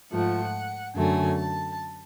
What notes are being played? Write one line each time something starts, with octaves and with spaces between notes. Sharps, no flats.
G#2 F3 A3 F#5
F#2 D3 F#3 A3 G#5
A5